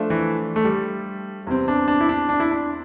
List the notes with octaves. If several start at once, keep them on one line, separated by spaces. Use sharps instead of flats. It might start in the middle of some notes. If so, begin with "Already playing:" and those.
Already playing: F3 A3 D4 A4
E3
A3
G3
E2 C3 G3 C4
D4
D4
E4
D4
D4
E4
D4